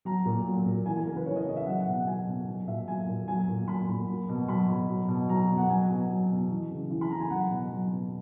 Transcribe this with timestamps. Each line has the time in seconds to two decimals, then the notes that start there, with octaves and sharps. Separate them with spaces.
0.05 F#3 A#5
0.25 A#2
0.46 F#3
0.66 A#2
0.86 E3 G#5
0.97 G#5
1.06 C#3 A#4
1.16 B4
1.26 E3 C#5
1.36 D#5
1.46 C#3 D#5
1.56 E5
1.66 F#3 F#5
1.80 F#5
1.87 B2
1.93 F#5
2.06 F#3 G#5
2.27 B2
2.47 F#3
2.67 A#2 E5
2.88 F#3 G#5
3.07 A#2
3.28 F#3 G#5
3.48 A#2
3.67 F#3 B5
3.89 A#2
4.09 F#3
4.29 B2
4.48 F#3 B5
4.68 B2
4.89 F#3
5.09 B2
5.29 F#3 A#5
5.50 B2
5.58 F#5
5.69 F#3 G#5
5.89 B2
6.10 F#3
6.31 B2
6.50 E3
6.70 C#3
6.90 E3
7.01 B5
7.10 C#3 A#5
7.20 G#5
7.30 F#3 F#5
7.51 B2
7.72 F#3
7.91 B2